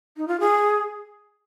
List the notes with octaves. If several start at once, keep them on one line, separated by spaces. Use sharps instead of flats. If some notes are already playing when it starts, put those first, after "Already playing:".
D#4
F4
G#4